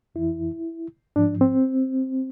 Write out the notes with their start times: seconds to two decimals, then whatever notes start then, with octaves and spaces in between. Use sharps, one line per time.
0.15 F2 E3 E4
1.16 G#2 F3 D4
1.41 C4